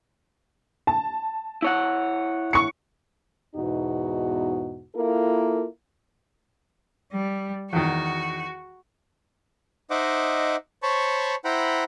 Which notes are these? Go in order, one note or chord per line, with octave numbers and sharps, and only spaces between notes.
A5
E4 C#5 F#5
C#6 C#7
E2 G#2 B2 D#4 F#4
A#3 E4 F4 A4 A#4
G3
E2 D#3 F#4
D#4 C5 D#5 E5 F#5 D6
C5 C#5 A5 B5 C#6
E4 C5 F#5 G5 A#5 B5